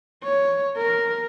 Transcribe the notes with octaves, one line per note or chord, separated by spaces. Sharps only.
C#5
A#4